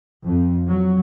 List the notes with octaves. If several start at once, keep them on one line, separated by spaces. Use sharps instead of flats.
F2
F#3